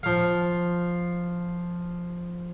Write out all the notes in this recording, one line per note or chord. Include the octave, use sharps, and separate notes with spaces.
F3 F5